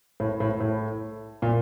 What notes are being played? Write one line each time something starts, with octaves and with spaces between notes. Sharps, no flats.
A2
A2
A2
A#2